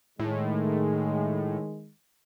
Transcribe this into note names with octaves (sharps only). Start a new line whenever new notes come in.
A2 D#3 G#3